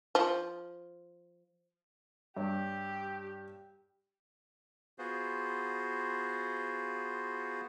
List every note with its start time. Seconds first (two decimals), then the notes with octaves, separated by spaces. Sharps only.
0.15 F3
2.37 G2 G4 C#5
4.99 B3 F4 F#4 G#4 C5